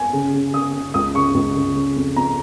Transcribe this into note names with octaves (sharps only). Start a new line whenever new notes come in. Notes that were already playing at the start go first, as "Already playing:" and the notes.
Already playing: G#5
C#3
C#3
C#3 D#6
C#3
C#2 D#6
C#3 C#6
C#2
C#3
C#3
F2
F2 A#5